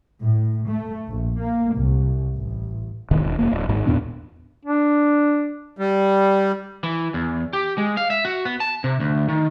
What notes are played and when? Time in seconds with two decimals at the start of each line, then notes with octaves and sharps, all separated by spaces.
0.23 A2
0.70 A3
1.09 A#1
1.39 A#3
1.75 C2
2.36 A1
3.11 E1 A1 D#3
3.23 E1
3.38 E1 A#3
3.51 D1
3.69 G#1 G#2
3.87 E2 A#2 B3 D4
4.65 D4
5.78 G3
6.83 E3
7.14 E2
7.53 G4
7.78 G#3
7.97 F5
8.10 E5
8.25 F#4
8.45 B3
8.60 A5
8.84 C3
9.00 D2
9.29 D#3